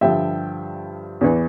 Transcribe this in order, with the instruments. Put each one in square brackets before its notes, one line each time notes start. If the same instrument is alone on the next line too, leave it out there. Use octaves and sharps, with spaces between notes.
[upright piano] G2 D3 F3 E5 G5
E2 E3